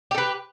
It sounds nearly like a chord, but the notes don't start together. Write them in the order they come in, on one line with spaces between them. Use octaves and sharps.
G4 A4 B4